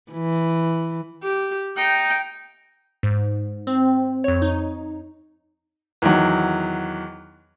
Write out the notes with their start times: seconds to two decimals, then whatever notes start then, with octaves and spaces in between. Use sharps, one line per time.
0.12 E3
1.23 G4
1.77 D#4 G5
3.03 G#2
3.67 C4
4.24 F2 C#5
4.42 D#4
6.02 E2 D#3 F#3